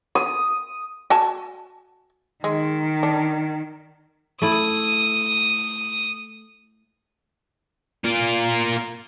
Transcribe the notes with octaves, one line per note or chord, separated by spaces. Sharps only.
D#6
F#4 G#5 A5
D#3 G#3
D4
A3 E4 D#6
A#3 F4